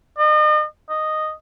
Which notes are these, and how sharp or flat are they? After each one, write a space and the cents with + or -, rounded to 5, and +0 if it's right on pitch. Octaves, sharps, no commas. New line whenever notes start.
D#5 -40
D#5 -5